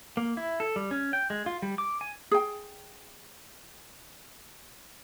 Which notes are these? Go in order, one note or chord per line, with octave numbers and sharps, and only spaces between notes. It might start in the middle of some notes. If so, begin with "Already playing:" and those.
A#3
E4
A4
G3
C#4
G5
G#3
F4
G3
D6
G#5
G#4 G5